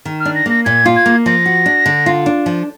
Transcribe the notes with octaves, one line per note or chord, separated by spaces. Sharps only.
D#3
F6
D4
A#6
A#3 A#6
A#2 G#6
F4
G#6
A#3
F3 A#6
F#4
D4
D3
F4
D4
F3